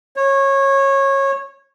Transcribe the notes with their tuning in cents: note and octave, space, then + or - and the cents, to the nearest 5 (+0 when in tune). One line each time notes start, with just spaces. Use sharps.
C#5 -20